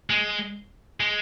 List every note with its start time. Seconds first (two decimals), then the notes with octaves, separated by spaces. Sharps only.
0.10 G#3
1.00 G#3